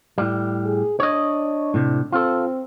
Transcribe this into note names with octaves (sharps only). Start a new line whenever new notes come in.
A2 G3
G#4
D4 C#5 D#5
A2 C3
C4 F4 A4